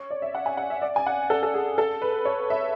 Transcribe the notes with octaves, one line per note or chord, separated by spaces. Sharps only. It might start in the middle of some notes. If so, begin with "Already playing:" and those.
Already playing: C#5
D5
E5
F#5
G#5
F#5
E5
D5
G#5
F#5
A4
A4
G#4
A4
B4
C#5
E5